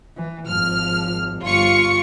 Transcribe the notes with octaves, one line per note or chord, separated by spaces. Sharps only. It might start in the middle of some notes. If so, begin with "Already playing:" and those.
E3
G#1 F3 F6
G1 F4 C#6 C#7